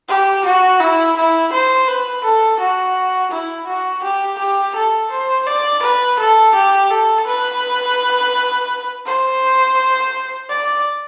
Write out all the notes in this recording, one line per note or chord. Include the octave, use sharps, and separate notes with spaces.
G4
F#4
E4
E4
C5
B4
A4
F#4
E4
F#4
G4
G4
A4
C5
D5
B4
A4
G4
A4
B4
C5
D5